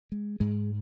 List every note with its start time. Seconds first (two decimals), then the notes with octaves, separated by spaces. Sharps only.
0.12 G#3
0.40 G#2 G#3